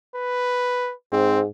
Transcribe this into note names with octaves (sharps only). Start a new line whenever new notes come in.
B4
G#2 C4